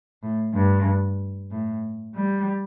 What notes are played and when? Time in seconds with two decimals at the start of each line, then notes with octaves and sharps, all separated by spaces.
0.22 A2
0.55 G2
1.51 A2
2.16 G3